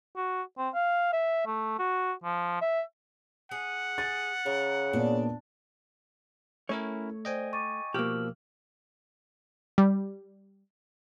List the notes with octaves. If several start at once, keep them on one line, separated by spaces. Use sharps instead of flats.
F#4
C4
F5
E5
A3
F#4
F3
E5
G#4 F#5
G#4 A6
C#3 A#4
A#2 B3 D4
A3 C#4 E4 A#4 C#5
C5 D5 D#5 G5 G#5
C#6 D6 A6 D#7
B2 F3 A#3 G4 E6 F6 F#7
G3